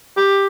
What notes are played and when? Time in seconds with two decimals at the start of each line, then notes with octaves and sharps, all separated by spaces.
0.17 G4